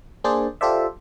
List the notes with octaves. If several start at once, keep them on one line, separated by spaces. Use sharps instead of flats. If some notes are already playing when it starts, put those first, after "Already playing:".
A#3 D4 G#4 C5 D5
F4 G4 A4 C5 D5 E5